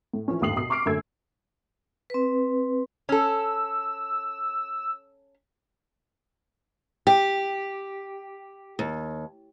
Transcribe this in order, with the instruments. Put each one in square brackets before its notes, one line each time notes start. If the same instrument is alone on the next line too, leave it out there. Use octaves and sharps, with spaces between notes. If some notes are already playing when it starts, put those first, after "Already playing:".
[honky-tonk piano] A2
E3 F3 C#4
G1 D#2 A2 D#6 C7 F#7
B2 D#6 C7
C#6 D6 F6 C7 D7
F#2 D3 A3 A#3 E6 G#6
[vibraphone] C4 B4
[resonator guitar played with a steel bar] C#4 A4 [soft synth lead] E6
[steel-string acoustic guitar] G4
D#2